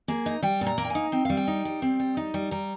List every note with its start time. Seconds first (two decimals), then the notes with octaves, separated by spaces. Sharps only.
0.08 A#3 G#4
0.26 D#4
0.43 G3 G5
0.61 A#2
0.67 A#5
0.78 A#3
0.84 G5
0.90 D#4 G#5
1.12 C4 G5
1.25 G3 F5
1.37 G5
1.47 D#4
1.65 G3
1.82 C4
1.99 G3
2.17 D#4
2.34 G3
2.51 G3 A#5